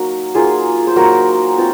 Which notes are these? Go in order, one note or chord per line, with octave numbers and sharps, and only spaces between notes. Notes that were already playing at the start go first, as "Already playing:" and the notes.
Already playing: F#3 A#3 D#4 F#4
F#3 A#3 D#4 F4 G#4
C5
F#3 A#3 D#4 F#4 A#4
C4 F4